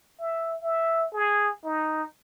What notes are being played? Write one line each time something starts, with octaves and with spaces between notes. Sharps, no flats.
E5
E5
G#4
D#4